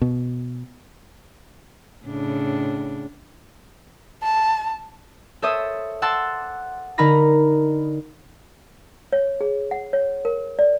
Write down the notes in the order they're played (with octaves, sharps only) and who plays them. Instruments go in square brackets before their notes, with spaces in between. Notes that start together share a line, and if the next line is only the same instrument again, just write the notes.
[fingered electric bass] B2
[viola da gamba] A2 C#3 D4
[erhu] A5
[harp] A4 C5 C#5 E5 D#6
F#5 A5 C6 D6 E6 A6
D3 D#4 A#4 A#5 B5 A#6
[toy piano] C#5
G#4
F#5
C#5
A#4
D5